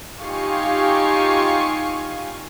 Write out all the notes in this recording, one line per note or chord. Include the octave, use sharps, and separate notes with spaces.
D#4 F4 G4 F5 G#5 C#6